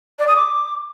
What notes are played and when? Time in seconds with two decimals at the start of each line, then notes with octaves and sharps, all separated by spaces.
0.19 D5
0.27 D#6
0.36 D6